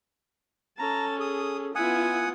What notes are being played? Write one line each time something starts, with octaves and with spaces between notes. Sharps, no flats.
C#4 A4 A5 A#5
G#4 D#6
B3 E4 F4 E5 F#5 G#5 D#6